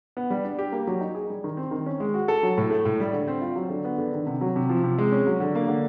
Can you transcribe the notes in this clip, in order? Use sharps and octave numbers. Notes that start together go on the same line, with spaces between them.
B3
G3
D4
G4
A#3
F#3
D#4
G#4
G3
D#3
C4
D#3
C#4
G#3
F#4
A4
F#3
A2
A3
A2
G3
D3
C4
F4
F#3
D3
B3
D3
D#3
C3
F#3
C3
F3
C3
G#3
C#4
F#3
D3
A#3
D3